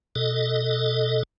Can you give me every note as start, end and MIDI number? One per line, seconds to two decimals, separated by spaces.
0.16 1.23 47
0.16 1.23 69
0.16 1.23 75